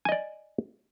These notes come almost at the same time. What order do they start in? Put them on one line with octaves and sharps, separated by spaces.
G#5 D#5 D5